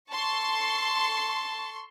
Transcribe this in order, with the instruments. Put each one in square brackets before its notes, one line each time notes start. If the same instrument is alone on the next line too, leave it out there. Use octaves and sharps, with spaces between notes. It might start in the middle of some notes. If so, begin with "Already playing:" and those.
[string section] A4 C6 C#6 [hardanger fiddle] A5